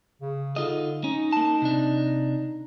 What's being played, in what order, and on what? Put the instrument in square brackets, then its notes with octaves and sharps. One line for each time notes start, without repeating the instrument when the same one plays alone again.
[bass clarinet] C#3
[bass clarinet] D3 [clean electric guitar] D#4 F4 D#5
[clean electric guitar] C#4 [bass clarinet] D#4
[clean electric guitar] A#3 A5
C3 D4